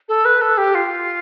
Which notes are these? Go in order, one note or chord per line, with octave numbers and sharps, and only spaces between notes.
A4
B4
A4
G4
F4